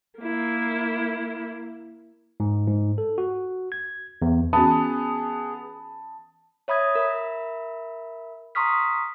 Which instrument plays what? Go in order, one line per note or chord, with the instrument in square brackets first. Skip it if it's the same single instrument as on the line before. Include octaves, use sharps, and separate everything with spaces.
[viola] A#3 E4
[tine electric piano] G#2
G#2
A4
F#4
G#6
E2
[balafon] E3 C#4 F#4 [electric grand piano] B3 [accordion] G#4 [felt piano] A5 B5 D#6
[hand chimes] C#5 E5 B5 D#6 G#6
A#4 E5 B5
A#5 C6 C#6 D#6 F6 B6